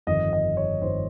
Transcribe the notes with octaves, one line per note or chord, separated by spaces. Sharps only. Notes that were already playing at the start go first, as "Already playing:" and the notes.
G1 F2 D#3 D#5
D#5
C#5
G1 F2 D#3 C5